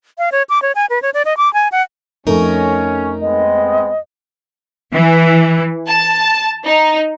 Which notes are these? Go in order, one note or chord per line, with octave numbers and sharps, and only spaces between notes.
F5
C#5
D6
C#5
G#5
B4
C#5
D5
D#5
D6
G#5
F#5
F2 A3 C#4 D#4 A#4
G#3 B3 C4 D#5
E3
A5
D#4